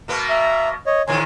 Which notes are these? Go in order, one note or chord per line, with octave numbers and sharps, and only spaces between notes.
B2 A#3 B3
E5 A#5
C#5 D#5
E2 A#2 D#3 C#5 G#5 C6